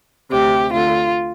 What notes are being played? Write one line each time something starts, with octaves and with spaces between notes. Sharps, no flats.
D2 C3 G4
D2 D3 F4